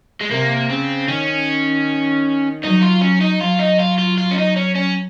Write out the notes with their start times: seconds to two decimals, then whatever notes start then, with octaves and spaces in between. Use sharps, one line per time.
0.21 G#3
0.30 C3 A#3
0.70 C#3 C4
1.08 D#3 C#4
2.63 F#3 D#4
2.82 F4
3.01 C#4
3.21 D#4
3.40 F#3 F4
3.59 D#4
3.79 F4
3.98 F4
4.18 F4
4.31 C#4
4.38 D#4
4.56 C#4
4.75 C#4